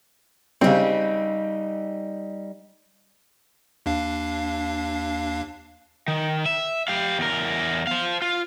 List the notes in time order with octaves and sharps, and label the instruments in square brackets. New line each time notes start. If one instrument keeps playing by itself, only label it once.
[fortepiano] C#3 C4 [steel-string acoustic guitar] G3 D#4
[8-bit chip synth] D#2 D4 F5
[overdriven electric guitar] D#3
E5
G4 F5
E2 A#4
C5 F5
F4